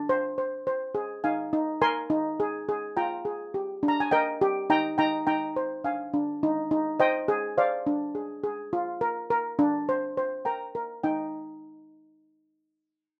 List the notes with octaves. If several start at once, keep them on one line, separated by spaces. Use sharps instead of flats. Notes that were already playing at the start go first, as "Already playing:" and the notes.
Already playing: D4
C5
C5
C5
G#4
D#4 F5 G#5
D#4
A#4 G#5 C6
D#4
G#4
G#4
F4 G5 A#5
G#4
G4
D4
A#5
G#5
A#4 D#5 G5
G4
D#4 G5 A#5
D#4 G5 A#5
D#4 G5 A#5
C5
D4 F5 G#5
D4
D#4
D#4
C5 D#5 G5
G#4
C5 D5 F5
D4
G#4
G#4
F4
A#4
A#4
D4
C5
C5
A#4 G5 A#5
A#4
D#4 G5